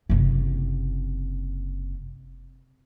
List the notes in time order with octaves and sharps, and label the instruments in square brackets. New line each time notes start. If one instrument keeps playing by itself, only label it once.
[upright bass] F#1 C3